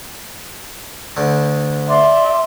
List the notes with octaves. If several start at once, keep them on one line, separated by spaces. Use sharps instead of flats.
D2 D3
D5 E5 C6